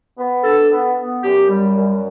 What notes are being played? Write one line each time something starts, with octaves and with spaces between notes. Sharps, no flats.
B3
D4 A4
B3
B3
F#2 G4
G3
F#2